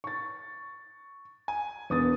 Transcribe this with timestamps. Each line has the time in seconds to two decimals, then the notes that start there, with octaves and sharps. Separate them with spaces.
0.04 C#6 A6
1.48 G#5
1.90 E1 B3 D#6 A6